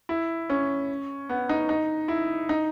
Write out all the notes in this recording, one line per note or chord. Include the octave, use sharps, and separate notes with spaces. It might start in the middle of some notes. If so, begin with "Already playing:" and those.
E4
C#4
B3
D#4
D#4
E4
D#4